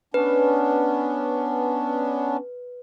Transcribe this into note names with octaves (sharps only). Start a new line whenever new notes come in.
B3 C#4 D4 B4